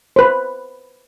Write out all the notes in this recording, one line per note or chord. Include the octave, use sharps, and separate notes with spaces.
B4 C5